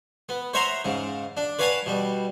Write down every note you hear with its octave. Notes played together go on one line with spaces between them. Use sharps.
B3
C5 C#5 E5 F#5 A#5 C6
G#2 C#3
D4
B4 C#5 F5 F#5 G#5 A5
B2 G3